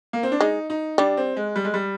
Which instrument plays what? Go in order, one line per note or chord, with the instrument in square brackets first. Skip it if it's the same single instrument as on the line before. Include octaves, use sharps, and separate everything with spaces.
[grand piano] A#3
C4
D4
[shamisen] G#3 [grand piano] D#4
[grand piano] D#4
[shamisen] G3 [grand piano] D4
[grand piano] C4
G#3
G3
G#3
G3